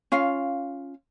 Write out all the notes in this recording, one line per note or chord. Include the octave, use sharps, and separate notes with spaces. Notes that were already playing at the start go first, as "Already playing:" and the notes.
C#4 F4 F5